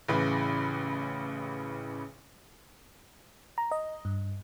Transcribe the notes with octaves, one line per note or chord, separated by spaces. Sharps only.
A1 C#3 E3 B4
A#5
D#5
G2